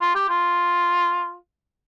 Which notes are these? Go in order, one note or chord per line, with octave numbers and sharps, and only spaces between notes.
F4
G4
F4